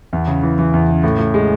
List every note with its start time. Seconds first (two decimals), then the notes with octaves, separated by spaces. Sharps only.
0.13 E2
0.28 C#3
0.43 E3
0.59 E3
0.74 E2
0.88 C#3
1.03 A2
1.18 A2
1.34 G#3